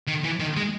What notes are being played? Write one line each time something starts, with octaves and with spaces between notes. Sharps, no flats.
D#3
E3
D#3
G#3